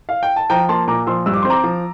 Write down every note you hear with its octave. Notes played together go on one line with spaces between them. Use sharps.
F5
G5
A5
F3 G5 A#5
A#3 A5 C6
A#2 A#5 D6
F3 C6 E6
G2 E6
D6
C4 C6
A#5 D6
F3